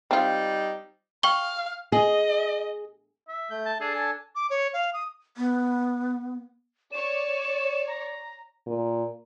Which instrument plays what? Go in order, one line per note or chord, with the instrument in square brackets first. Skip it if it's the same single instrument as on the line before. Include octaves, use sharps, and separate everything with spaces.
[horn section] G3 D#4 [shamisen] C4 F4
[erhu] F5 [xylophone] G5 C#6 G7
[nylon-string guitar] G#4 [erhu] D#5
[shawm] E5
[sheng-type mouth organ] A3 G6
[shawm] A5
[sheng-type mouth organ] D4 A4 A5 [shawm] G#4
[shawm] G#5
[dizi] D6
C#5
F5
D#6
[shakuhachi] B3
[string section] C#5 D5 [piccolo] E7
[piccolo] A#5
[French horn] A#2